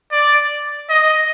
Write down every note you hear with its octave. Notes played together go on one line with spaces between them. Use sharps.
D5
D#5